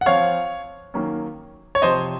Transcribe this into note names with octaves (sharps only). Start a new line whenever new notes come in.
F#5
F3 C4 C#5 F5
D#3 F#3 A#3 C#4
C#5
C3 F3 C4 C5 D#5